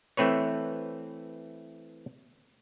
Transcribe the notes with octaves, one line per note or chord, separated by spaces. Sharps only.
E3 A3 C4 B4 C#5